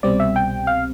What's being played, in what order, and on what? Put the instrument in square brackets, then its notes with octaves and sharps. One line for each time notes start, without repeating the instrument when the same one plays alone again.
[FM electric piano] C2 B2 G3 C4 D5
E5
G5
F5